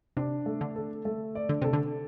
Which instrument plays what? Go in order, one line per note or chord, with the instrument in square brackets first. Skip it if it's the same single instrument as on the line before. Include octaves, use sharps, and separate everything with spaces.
[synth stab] C3 [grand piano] D4
[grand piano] A3
[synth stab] D3
[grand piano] A4
A3
D5
[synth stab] D3
[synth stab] C3 [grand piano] A4
[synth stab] D3